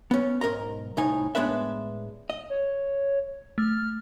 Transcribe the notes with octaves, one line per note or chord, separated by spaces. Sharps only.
B3 C#4
B1 G#2 A#4 D#5 A#5
C2 A2 D#4 G#5
A2 G#3 B3 D4 B4 E5
D#5
C#5
A3 F6